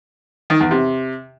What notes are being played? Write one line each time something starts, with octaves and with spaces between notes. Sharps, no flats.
D#3
E2
C3